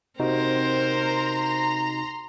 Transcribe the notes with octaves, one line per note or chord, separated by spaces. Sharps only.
C3 C4 D#4 F#4 A#4 C5
A#5 C6